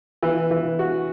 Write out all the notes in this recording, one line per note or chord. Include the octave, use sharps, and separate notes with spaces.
E3
E3
F#4